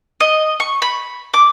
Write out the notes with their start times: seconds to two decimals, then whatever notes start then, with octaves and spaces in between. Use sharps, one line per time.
0.20 D#5
0.60 C#6
0.82 B5
1.34 D6